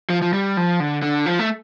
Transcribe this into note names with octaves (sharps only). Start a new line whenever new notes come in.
F3
F3
G3
F3
D3
D3
F3
A3